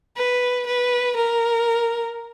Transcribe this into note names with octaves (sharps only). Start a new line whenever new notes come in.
B4
B4
A#4